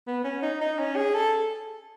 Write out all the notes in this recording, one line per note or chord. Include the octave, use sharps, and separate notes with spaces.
B3
C#4
D#4
D#4
C#4
G#4
A4